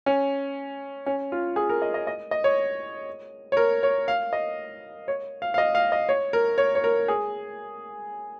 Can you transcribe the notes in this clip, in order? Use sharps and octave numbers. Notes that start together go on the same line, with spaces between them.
C#4
C#4
F4
G#4
A#4
D#5
D#5
D#5
D#5
C#5
C#5
A#4
C#5
F5
D#5
C#5
F5
F5
D#5
F5
D#5
C#5
A#4
C#5
C#5
A#4
G#4